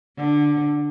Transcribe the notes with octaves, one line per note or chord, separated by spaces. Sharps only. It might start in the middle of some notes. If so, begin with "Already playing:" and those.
D3